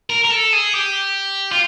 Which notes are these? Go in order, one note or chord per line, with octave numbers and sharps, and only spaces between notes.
A#4
A#4
A4
G#4
G4
F4